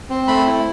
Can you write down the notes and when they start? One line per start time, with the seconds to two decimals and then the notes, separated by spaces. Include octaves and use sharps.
0.10 C4
0.28 A3 B5
0.46 E4